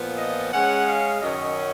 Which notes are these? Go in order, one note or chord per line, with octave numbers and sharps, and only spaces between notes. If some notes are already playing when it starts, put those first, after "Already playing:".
Already playing: A#2 F3 B3
D#5
C#3 G#3 C#4 F#5
F5
F#2 D#3 F#3 C#4 D#5